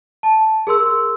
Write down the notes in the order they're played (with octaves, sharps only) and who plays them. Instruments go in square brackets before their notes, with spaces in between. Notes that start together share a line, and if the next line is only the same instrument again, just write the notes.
[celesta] A5
G#4 A#4 C6 E6